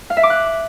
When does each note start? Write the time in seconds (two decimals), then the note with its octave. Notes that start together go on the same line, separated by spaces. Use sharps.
0.10 F5
0.17 E5
0.23 D6
0.30 F#6